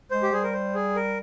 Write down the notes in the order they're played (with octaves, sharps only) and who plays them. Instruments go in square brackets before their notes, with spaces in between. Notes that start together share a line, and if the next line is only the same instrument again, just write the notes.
[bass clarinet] G#3 [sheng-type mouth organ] C5
[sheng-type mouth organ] G4
[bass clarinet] G3 [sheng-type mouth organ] G#4
[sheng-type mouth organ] A#4
C5
G#4
A#4